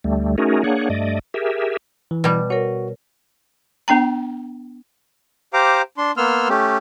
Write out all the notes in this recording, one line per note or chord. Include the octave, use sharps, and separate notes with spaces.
D2 G3 A3
A3 C#4 D#4 F#4 G#4 A#4
A#3 D4 G#4 C#5 F#5
G2 A3 D5 D#5
G4 G#4 A#4 E5
E3
B2 G3
F#4 A#4 C#5
B3 D4 G5 A#5
G4 C5 F5 A#5 D6
D4 C6
A#3 B3 C6 E6 F6
A3 C#4 G4